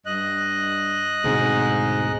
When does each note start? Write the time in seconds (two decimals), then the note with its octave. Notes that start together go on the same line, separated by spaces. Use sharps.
0.06 G2 D#5 F#6
1.24 D2 G#2 B2 C4